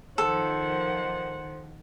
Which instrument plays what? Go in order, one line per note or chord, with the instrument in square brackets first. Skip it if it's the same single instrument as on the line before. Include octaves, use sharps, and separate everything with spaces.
[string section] D#3 F3 [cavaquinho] A4 [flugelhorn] C5 [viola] F#5